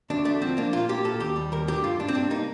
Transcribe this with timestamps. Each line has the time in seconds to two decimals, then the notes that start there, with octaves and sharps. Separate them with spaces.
0.10 D2 D4
0.25 A3 D4
0.42 F3 C4
0.57 A#3 D4
0.73 A#2 F4
0.89 A#2 G4
1.04 A#2 A4
1.20 D#2 G4
1.36 G3
1.52 D#2 A#4
1.68 D3 G4
1.84 G2 F4
1.99 G2 D4
2.08 C4
2.15 C3 D4
2.30 A#3 D#4